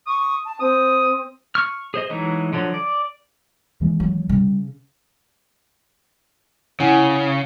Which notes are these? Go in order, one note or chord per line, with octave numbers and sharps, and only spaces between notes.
C#6 D#6
A5
C4 D#6
C#6 F6
G#4 C5 D#5
E3 F#3 G#3 A3 D#4
D3 F3 F#3
D5
D#2 E3 G#3
F#3
C#3 G3
C#3 E4 F#5 G#5